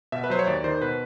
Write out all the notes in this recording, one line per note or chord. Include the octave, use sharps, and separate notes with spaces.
B2 E5
B4
F#3 C5
C#5
D#2 D5
D#3 C5
B2 B4